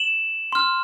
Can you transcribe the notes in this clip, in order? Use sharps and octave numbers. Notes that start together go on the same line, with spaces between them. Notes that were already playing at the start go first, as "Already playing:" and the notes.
Already playing: E7 F#7
C6 F6